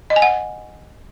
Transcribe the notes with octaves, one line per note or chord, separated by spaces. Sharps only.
D#5
G#5
F#5